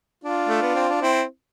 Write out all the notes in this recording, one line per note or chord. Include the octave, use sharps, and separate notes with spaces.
D4 F4
A3
B3
C4
D4
C4 E4